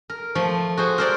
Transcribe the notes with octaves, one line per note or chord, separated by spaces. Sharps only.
A#4
F3 A3
F#4 G#4 C5
A#4 C5 D5